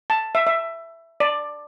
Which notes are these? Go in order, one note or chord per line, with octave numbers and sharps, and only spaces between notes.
A5
E5
E5
D5